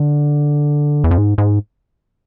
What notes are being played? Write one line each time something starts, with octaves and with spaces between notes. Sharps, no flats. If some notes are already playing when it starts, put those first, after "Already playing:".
Already playing: D3
E2
F2
G#2
G#2